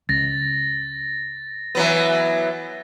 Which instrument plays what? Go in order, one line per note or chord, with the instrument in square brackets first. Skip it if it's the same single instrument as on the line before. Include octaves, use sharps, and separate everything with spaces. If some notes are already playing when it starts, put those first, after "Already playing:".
[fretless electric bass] C#2 [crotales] A6 A#6
[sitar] E3 F#3 B3